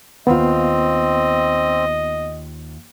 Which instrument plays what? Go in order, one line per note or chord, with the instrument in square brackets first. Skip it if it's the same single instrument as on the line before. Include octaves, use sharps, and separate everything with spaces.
[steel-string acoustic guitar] D#2 F4 [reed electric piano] B3 [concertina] C4 [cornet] D#5